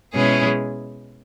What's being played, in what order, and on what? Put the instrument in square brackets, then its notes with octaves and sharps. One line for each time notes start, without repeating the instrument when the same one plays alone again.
[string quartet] B2 G#3 C#4 E4 G#4